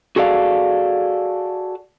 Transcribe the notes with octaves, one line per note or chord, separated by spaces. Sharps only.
F#4 G#4 A4 D5 F5